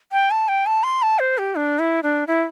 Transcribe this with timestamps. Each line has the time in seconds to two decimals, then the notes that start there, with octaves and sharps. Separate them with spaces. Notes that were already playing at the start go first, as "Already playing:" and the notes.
0.12 G5
0.31 A5
0.48 G5
0.66 A5
0.83 C6
1.02 A5
1.19 C5
1.38 G4
1.56 D4
1.79 E4
2.03 D4
2.27 E4